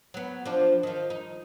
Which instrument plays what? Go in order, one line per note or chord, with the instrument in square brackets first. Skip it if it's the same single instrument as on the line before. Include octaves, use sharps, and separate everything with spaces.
[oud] F#3 B3
F3 D4
D#3 F3
D#4